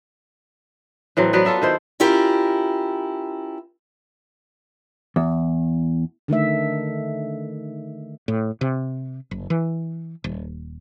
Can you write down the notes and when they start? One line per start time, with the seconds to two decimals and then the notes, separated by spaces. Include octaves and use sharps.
1.17 A2 E3 F#3 C4
1.33 F#3 B3 B4 D5
1.45 F4 A4 E5 F#5
1.62 D#3 E4 C5
2.00 C#4 E4 F4 G4 A#4
5.16 E2
6.28 D3 D#3 A3 E5
8.28 A2
8.61 C3
9.31 F#1
9.50 E3
10.24 D#1